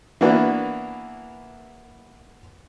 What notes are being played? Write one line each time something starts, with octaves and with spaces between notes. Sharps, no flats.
E3 A#3 B3 D4 E4 F#4